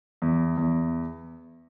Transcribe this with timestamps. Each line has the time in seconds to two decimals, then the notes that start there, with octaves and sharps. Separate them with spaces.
0.22 E2
0.57 E2